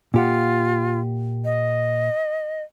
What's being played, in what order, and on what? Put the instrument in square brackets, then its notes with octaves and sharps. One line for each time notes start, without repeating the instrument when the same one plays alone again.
[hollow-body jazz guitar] A#2 G4 F#5 [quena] F4
[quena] D#5